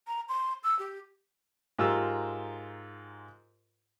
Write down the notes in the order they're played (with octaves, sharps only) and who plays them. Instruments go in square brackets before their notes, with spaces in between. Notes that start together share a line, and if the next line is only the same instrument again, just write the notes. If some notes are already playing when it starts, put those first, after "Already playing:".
[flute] A#5
C6
E6
G4
[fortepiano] G#2 F4 G4 A#4 E6